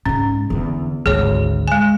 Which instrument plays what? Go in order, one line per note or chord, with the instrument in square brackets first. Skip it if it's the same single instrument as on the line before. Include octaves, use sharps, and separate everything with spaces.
[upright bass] G#2 G#3 [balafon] C#4
[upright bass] E2 D3
[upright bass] G#1 D2 [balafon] G#4 C#5
[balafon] G#3 G#5